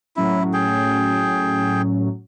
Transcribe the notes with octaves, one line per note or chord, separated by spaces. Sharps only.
A2 F#3 C#4 E4
G#4 G5